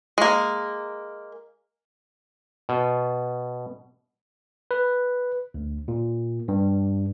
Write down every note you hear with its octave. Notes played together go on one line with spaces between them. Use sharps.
G#3 A#3
B2
B4
D2
A#2
G2